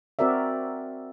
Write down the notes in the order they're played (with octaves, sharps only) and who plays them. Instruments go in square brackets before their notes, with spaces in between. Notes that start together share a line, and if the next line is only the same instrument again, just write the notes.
[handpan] C4 F#4 A#4 D5 E5